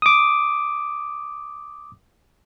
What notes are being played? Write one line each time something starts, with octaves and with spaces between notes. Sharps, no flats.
D6 D#6